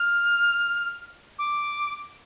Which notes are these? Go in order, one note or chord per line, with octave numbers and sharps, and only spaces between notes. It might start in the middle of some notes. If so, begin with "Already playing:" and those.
Already playing: F6
D6